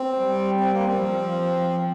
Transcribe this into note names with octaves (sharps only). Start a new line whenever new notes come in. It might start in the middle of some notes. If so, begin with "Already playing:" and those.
Already playing: C4
G3
C4
A#3
C4
F3